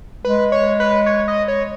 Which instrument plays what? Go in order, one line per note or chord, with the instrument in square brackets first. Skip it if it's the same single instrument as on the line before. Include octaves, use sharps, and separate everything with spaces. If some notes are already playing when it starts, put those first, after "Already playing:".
[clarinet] G#3 [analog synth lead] B4
[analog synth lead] C#5
B4
C#5
D#5
C#5